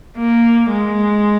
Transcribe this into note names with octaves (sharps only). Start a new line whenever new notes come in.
A#3
G#3